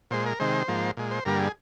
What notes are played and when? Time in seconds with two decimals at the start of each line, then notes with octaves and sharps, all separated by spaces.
0.11 A#2 G#3 C5
0.26 A#4
0.40 C3 D#3 G#3 C5
0.68 G#2 F3 A#3
0.97 A#2 G#3
1.11 C5
1.25 G2 D3 G3 A#3 A#4
1.39 G#4